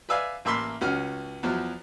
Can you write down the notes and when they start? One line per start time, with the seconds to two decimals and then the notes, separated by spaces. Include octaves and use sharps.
0.09 B4 D5 E5 F5 G#5
0.45 A1 A#3 E5 B5 C6
0.81 C#2 C#4 F#4 F6
1.43 E2 F3 F#3